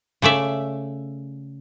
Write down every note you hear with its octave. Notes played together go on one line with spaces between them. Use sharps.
C#3 A3 D5 E5